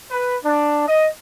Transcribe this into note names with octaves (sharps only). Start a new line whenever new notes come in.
B4
D4
D#5